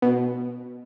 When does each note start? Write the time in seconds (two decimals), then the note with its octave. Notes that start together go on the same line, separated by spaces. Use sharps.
0.02 B2